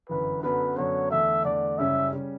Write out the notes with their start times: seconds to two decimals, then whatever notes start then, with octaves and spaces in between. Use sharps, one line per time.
0.09 G1 F#2 E3 B4
0.43 F#2 D3 F#3 B3 B4
0.76 F#2 D3 F#3 B3 C#5
1.10 E2 D3 A3 E5
1.44 E2 D3 A3 D5
1.78 F#1 F#2 C#3 G3 C#4 E5
2.13 C#3 G3 C#4